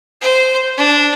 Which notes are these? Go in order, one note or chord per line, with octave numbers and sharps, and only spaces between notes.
C5
D4